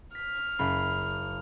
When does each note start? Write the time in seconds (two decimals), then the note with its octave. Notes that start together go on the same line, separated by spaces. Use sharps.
0.15 F6 B6
0.59 F#1 B5 C7